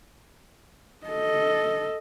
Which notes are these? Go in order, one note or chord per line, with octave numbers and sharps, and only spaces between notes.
A4 D#5